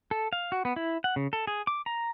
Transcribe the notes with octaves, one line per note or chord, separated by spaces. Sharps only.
A4
F5
F#4
B3
E4
F#5
C#3
A4
G#4
D6
A#5